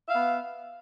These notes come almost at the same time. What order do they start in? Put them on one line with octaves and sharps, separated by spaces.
E5 F5 B3